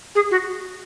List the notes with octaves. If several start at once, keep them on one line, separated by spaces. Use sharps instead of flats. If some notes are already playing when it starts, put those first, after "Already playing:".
G#4
F#4